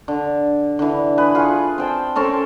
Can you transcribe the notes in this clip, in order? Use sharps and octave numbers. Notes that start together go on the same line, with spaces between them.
D3
D3 E3
G#4 B4
F4 G#4 C#6
C4 G5 A5
C4 C#4 A4 A#4